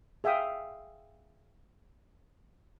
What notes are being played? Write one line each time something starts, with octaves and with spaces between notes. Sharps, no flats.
G#4 E5 F5 G5 D#6